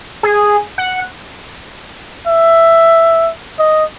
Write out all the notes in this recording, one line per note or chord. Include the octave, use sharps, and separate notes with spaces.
G#4
F#5
E5
D#5